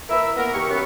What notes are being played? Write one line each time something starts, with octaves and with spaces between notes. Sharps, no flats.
A#3 E4 A#4 B4 E5
A#3 B3 A#4
D#2 G4 C#6
F#2 B3